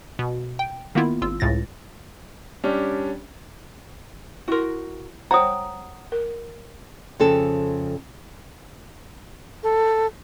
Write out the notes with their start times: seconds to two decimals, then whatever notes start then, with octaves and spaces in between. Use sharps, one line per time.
0.19 B2
0.59 G5
0.95 D#3 A#3 B3 E4 F4
1.22 G#1 F4 E6
1.40 C#2 A2 A6 A#6
2.63 G3 C#4 D4 G4
4.48 E4 F#4 A#4 C6
5.31 C5 C#5 F#5 G5 A#5 D#6
6.12 A#4
7.19 F2 C#3 A4
9.63 A4